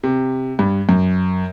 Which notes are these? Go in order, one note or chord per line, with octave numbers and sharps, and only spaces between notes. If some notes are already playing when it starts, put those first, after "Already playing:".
C3
G2
F#2